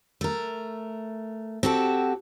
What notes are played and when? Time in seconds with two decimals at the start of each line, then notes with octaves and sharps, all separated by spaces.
0.21 A3 A#4
1.63 C4 F#4 G4 A4